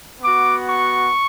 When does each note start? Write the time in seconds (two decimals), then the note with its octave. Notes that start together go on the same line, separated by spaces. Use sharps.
0.22 B3 F#4 D6
0.68 C#6